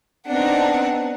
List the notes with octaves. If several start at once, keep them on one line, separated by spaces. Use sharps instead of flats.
B3 C4 D4 D#4 F#5